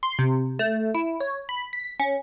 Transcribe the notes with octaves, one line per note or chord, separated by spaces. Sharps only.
C6
C3
A3
E4
C#5
B5
B6
C#4